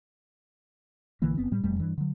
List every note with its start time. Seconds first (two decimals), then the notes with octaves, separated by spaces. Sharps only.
1.22 A#1 D3 E3 A#3
1.37 F#1 B3 C4
1.52 A2 G3
1.63 E1 F2 G3 A3
1.80 G2 E3
1.98 D3 F#3